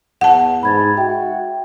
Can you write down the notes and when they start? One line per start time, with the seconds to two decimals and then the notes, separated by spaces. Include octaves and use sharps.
0.21 E2 F#5 A5
0.63 G#2 B5 G#6 A6
0.97 F#4 E5 G5